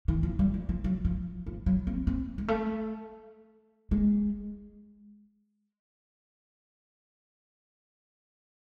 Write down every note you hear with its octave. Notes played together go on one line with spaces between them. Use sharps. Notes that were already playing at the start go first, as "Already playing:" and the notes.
E3
F3
G3
F3
F3
F#3
F3
F3
F#3
C4
C4
G#3
A3
G#3